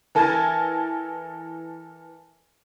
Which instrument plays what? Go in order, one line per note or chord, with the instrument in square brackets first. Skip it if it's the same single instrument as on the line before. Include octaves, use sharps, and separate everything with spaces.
[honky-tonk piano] E3 A4 A#4 G#5 A5 G#6